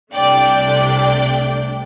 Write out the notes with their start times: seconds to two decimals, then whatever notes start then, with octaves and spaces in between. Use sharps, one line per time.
0.13 C2 C3 A3 D4 D5 G5
0.60 D5 G5